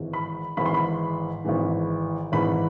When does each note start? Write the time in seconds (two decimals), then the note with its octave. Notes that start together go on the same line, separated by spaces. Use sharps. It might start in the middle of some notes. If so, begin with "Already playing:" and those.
Already playing: G#1 G#2 E3
0.13 B5
0.57 G#1 G#2 E3 B5
0.66 C6
0.74 B5
1.45 G#1 G#2 E3
2.32 G#1 G#2 E3 B5